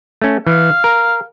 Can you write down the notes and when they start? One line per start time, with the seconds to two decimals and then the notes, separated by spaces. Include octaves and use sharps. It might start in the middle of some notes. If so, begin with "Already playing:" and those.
0.22 A3 C#4
0.47 E3 F5
0.84 A#4